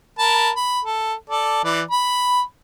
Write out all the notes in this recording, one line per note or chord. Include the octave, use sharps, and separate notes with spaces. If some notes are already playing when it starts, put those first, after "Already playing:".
A#4 A5 B5
B5
A4
A4 D5
E3 D5
B5